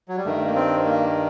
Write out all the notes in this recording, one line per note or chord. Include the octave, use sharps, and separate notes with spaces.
F#3
G3
G2 D#3 A3
A#3
C4
A#3